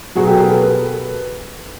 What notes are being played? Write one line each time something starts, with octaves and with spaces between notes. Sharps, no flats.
B2 F#3 F#4 G#4
G4 A4
G#4 A#4
A4 B4